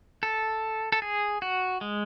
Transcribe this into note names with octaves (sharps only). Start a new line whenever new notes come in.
A4
A4
G#4
F#4
G#3